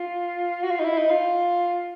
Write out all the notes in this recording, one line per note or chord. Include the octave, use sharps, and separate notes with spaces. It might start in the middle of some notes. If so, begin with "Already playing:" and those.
Already playing: F4
F#4
F4
D#4
E4
D#4
F4